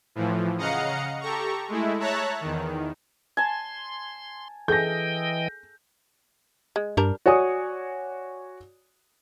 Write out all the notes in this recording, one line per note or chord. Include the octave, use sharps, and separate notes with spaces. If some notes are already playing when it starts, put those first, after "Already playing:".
A2 E3 F3
C#3 D#5 F5 F#5 A#5 C#7
G4 A4 A#5 C#6
G#3 A3 E4
C#5 E5 A5 A#5 F#6
E2 D#3
G#5 A5 C6
E3 G#4 A4 D#5 G5 G6 A#6
G#3
G2 G3 D4 A#4
F#4 C#5 D5 G#5 D#6